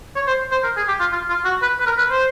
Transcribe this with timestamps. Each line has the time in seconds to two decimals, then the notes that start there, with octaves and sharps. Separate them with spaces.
0.15 C#5
0.27 C5
0.52 C5
0.64 A#4
0.77 G#4
0.88 G4
1.00 F4
1.12 F4
1.29 F4
1.45 F#4
1.62 B4
1.80 B4
1.87 A#4
1.98 B4
2.11 C5